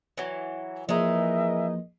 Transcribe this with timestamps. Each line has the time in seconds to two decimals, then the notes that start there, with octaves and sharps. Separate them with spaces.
0.18 E3 F#3
0.89 E3 F3 G#3 A#3 D#4 A#4 D#5 E5